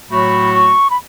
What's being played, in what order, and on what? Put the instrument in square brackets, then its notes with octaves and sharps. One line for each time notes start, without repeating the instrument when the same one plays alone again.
[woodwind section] A2 F#3 A3 F#4 [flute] B5
[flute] C#6
B5